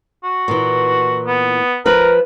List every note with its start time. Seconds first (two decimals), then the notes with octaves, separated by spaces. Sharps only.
0.24 F#4
0.48 A#2 E3
1.27 B3
1.86 F3 A#4 B4